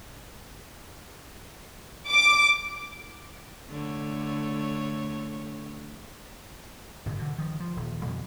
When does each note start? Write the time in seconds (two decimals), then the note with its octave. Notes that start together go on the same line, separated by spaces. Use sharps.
2.09 D6
3.69 D3 A3 C#5
7.06 G1 A2 C3
7.18 B2 D3
7.39 D#3 F3
7.60 F3
7.76 D#1
8.02 F2 B2 D3 G3